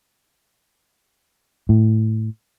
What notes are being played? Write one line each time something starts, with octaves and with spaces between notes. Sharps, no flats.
A2